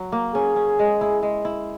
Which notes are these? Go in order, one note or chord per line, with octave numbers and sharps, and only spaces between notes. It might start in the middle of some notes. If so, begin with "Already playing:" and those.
Already playing: F#3
A#3
C#4 G#4
C#4
G#3
E4
G#3
E4